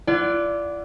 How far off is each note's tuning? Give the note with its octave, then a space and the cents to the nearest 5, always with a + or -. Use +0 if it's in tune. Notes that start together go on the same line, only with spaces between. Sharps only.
F4 -45 D5 -10 F#5 +0